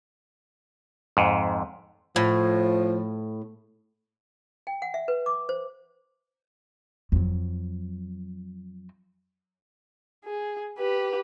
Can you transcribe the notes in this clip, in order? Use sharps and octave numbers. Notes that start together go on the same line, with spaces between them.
F2 G#2
A2 F3
G5
F#5
E5
B4
D6
C5
F2 F#3
G#4
G4 B4